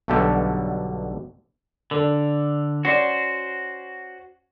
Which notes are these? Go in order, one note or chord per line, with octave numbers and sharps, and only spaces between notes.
B1 G2 B2 D3 G4 A4
D3 D4 A4
C#4 F#4 C5 D5